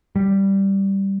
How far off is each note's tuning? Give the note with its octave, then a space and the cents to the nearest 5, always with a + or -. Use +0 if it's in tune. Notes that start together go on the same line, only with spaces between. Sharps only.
G3 -5